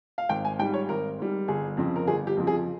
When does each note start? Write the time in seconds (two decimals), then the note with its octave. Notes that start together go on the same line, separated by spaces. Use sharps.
0.18 F5
0.29 G#1 G5
0.45 G#5
0.59 G#2 G3 G5
0.74 C#5
0.89 G#1 A#4
1.18 G#2 G3
1.48 G1 G#4
1.77 F2 C#3 F3 C4
1.96 A#4
2.07 G1 G#4
2.27 G4
2.37 F2 C#3 F3 C4
2.47 G#4